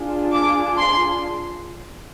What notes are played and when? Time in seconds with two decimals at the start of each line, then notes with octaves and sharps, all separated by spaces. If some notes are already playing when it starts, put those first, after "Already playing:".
Already playing: D4 F4 G#4
0.33 D6
0.78 C6